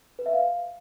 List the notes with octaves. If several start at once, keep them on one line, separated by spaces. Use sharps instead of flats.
B4
E5
F5